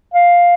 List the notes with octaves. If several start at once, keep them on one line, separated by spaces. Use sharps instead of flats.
F5